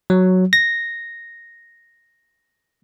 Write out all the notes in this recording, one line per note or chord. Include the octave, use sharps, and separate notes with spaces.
F#3
A#6